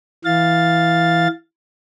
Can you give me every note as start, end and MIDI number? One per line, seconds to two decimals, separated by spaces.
0.25 1.28 52
0.25 1.28 77
0.25 1.28 93